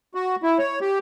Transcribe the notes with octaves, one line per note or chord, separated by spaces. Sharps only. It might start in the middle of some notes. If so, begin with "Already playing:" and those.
F#4
E4
C#5
G4